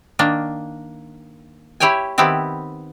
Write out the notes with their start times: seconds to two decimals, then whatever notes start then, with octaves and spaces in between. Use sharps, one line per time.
0.19 D#3 A#3 D4
1.80 E4 G4 C#5 G5 G#5
2.18 D#3 B3 C4 E4 G4